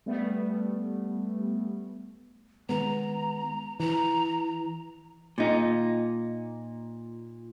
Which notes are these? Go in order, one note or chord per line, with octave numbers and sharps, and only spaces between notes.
G3 A3 B3
D#3 G#3 B3 A#5
E3 A#5
A#2 D#4